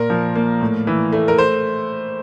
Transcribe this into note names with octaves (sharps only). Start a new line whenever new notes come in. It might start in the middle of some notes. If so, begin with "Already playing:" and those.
Already playing: A#2 A#4
F3
A#3
A2
E3
A3
A#4
C5